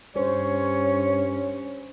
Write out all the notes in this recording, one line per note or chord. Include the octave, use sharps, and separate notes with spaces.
G2 C#4 C5 C#5